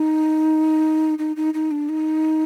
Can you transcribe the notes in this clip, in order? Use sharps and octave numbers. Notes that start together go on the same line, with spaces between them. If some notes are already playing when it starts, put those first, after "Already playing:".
Already playing: D#4
D#4
D#4
D#4
D4
D#4